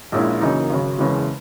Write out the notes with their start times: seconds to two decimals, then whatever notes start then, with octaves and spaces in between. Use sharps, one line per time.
0.12 A#1 A#2 G#3 C#4 E4
0.41 F#2 C#3 E3 A#3 D#4
0.70 G#1 F#2 C#3
0.98 F#1 E2 C#3 E3 G#3